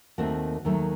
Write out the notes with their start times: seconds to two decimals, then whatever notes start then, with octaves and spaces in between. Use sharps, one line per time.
0.18 D#2 D#3 A3 C4 F#4
0.65 D#2 D#3 F#3 A3